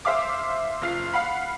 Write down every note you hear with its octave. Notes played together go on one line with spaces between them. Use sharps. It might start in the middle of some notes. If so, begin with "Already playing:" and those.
C5 E5 F5 D6
F#1 F4 C7
F5 F#5 B5